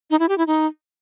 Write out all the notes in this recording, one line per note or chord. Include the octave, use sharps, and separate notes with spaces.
D#4
E4
G4
E4
D#4